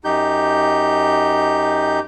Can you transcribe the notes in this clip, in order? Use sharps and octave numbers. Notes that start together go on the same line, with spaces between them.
F#2 D#4 G4 G6